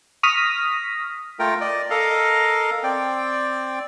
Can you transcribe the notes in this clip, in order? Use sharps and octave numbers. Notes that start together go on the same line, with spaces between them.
C#6 D#6 F6 A#6 B6
A3 F4 A#4 G5
D5 D#5
A4 A#4 D#5 F5
C4 D5 G5